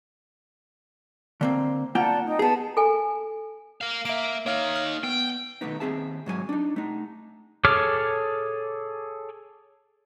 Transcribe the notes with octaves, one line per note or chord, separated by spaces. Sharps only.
D3 A#3 C4
A#3 F4 D5 F#5 G5 A5
D#4 G5
B3 G#4 A5
A4 G#5
A#4 F5
A#3 E5 D7
A#3 D#4 C#5 F5 F6
F6
B3 G5
B2 D#3 A3 B3 D#4
D#2 G#3 C4 G#4 E5 A5
G#2 F#3 A4 G#5
D4 D#4
A3 D#4
G#4 A4 C#5 D6 F6